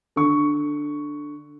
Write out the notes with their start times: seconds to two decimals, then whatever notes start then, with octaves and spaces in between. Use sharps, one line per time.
0.16 D3 C#6